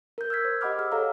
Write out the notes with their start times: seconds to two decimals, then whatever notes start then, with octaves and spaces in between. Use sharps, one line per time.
0.18 A#4 G6
0.30 E6 F6 G#6 B6
0.45 C5
0.61 G4 D#5 F#5 B5 D6 F6
0.79 G#4 E6 F6
0.92 A4 C#5 F5 A#5